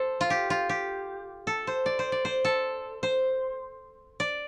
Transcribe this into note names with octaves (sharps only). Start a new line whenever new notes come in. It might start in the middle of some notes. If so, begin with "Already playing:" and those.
Already playing: A4 C5
F4
G4
F4
G4
A4
C5
D5
C5
D5
C5
A4
C5
D5